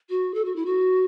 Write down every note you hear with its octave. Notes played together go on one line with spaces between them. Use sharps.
F#4
A4
F#4
E4
F#4